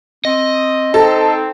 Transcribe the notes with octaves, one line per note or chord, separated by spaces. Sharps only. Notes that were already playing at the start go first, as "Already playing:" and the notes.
C4 D#5
C4 D#4 A4